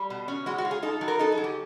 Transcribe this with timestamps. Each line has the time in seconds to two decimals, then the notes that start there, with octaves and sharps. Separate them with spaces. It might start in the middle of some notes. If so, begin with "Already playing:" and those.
Already playing: G3
0.10 B2
0.28 C#4
0.46 G#3 F#4
0.58 F#4
0.65 F4
0.71 G#4
0.82 D#4 A4
1.01 F#3
1.08 A#4
1.19 D#4 A4
1.32 G#4
1.37 F#3
1.44 G4